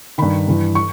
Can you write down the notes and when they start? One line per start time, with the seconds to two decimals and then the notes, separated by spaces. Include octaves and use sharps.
0.18 G2 D#3 B5
0.48 G2 E3
0.75 C#6